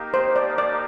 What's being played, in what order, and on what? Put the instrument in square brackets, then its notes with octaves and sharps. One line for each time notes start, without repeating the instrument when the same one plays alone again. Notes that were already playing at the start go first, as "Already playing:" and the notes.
Already playing: [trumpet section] A#3 D#4 G4
[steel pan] C5
D5
D5